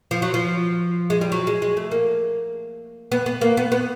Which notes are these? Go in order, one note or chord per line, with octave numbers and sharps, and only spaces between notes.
F3
F#3
F3
G#3
G3
F#3
G#3
G#3
A3
A#3
B3
B3
A#3
B3
B3